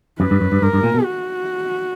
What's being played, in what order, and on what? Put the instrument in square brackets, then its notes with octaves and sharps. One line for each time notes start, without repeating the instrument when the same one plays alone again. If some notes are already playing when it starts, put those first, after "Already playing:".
[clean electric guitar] F#2 [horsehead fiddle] B4
[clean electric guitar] G2
F#2
G2
[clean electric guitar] G2 [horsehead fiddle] A#4
[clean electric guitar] G2
A#2
B2
[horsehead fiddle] F#4